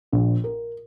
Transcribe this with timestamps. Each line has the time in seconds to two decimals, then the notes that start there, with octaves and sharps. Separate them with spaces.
0.12 A#1
0.44 A#4